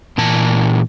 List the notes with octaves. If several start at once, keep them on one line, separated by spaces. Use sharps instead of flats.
A#2 E3 A5